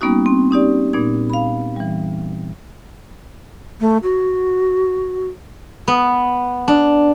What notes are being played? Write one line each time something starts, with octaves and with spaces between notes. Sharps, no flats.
G3 A#3 B3 C#4 D#4 F#4
C4
C#4 D#4 G4 D5
A#2 B3 D#4 G#6
F5 B5
E3 G3
A3
F#4
B3
D4